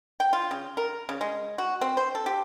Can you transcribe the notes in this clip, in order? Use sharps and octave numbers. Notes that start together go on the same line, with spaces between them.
G5
F4
C#3
A#4
C#3
G#3
F#4
C4
C5
A4
G4